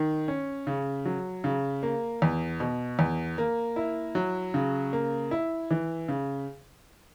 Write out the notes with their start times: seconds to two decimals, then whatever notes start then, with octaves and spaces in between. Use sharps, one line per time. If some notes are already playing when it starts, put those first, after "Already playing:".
Already playing: D#3
0.28 C#4
0.67 C#3
1.05 F#3
1.44 C#3
1.83 A#3
2.22 E2
2.60 B2
2.99 E2
3.38 A#3
3.76 E4
4.15 F#3
4.54 C#3
4.93 A#3
5.31 E4
5.71 E3
6.08 C#3